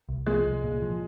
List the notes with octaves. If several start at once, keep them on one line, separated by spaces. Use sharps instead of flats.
C2
F3 G#3
C2
A#2
F3